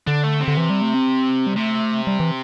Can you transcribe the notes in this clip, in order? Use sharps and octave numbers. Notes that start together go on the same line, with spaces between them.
D3 D4
A3
C3
D3
E3
G3
A3
C4
G3
C3 A3
G3
E3